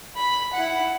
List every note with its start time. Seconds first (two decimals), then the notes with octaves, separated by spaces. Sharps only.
0.17 B5
0.54 E4 F#5